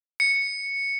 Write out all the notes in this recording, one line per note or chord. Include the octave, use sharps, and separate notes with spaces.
C#7